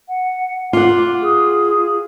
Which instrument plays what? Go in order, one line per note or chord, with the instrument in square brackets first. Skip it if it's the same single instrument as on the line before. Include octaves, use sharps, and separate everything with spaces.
[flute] F#5
[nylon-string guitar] F4 F#5 [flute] D6
[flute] G#4